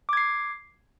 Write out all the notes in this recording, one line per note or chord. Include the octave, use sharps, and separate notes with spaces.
D6 G#6 C7